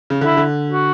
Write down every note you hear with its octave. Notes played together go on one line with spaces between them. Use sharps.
C#3
D3 E4
D3
F#4